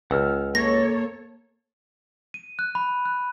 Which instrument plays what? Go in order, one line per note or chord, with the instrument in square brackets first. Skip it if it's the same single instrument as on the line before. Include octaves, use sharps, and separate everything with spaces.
[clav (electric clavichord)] C#2 [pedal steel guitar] F#5 E6 F6
[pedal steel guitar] A#3 [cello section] A4 C#5 [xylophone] A#6
[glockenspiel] D#7
F#6
B5
F#6